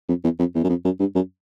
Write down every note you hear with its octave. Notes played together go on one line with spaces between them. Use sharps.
F2
E2
F2
E2
F#2
F2
F#2
G2
F#2